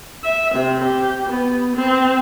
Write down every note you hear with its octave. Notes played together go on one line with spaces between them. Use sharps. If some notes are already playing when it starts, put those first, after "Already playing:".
E5
C3
G4
B3
C4